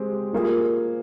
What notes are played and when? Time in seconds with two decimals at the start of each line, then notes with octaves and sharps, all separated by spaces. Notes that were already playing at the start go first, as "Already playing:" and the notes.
Already playing: G#3 C4 G4
0.33 G3 A#3 F4 G#4